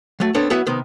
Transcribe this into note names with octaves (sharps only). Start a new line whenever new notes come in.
F#3 A3
B3 C4 D4 A4 C#5
F#3 B3 E4 B4 E5 F#5
C3 D#3 B3